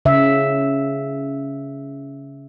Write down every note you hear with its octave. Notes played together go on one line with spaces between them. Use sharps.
C#3 E5